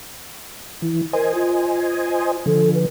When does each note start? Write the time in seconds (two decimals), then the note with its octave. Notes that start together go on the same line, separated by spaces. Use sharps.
0.82 E3 E4
1.13 A#4 C5 D#5 G#5
1.35 F4
2.46 D3 F3 A4
2.74 B4